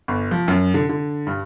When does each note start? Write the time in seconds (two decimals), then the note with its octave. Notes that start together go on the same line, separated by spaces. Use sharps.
0.08 G1
0.31 F3
0.48 F#2
0.74 D3
0.89 D3
1.27 G2